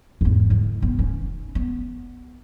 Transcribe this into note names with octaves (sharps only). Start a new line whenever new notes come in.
E2 G#2
D3 G#3
B3
C#4 D#4
B3